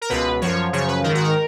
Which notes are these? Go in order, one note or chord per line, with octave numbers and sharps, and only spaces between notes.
A#4
C#2 B2 B4
F#2 F3 C#5
F#2 C#3 F3 C#5
B4
G#2 D#3 A#4
F#4
A#4